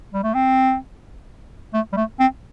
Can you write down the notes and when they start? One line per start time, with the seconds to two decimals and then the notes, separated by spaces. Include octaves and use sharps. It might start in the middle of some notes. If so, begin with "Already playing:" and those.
0.14 G3
0.23 A3
0.34 C4
1.73 A3
1.93 G3
1.97 A3
2.19 C4